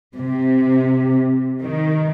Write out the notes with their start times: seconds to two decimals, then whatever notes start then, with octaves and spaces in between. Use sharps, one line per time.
0.16 C3
1.60 D#3